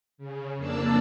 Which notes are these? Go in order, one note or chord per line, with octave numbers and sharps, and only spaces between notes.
C#3
F2 A#3 D4 D5 A5 E6